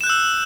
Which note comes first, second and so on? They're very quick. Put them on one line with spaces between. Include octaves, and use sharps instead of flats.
E7 F#6 G6 E6